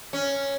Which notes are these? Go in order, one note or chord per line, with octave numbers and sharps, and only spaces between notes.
C#4